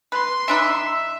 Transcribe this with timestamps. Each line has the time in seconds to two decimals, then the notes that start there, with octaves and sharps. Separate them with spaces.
0.12 B4 C6
0.48 E3 D4 D#4 E5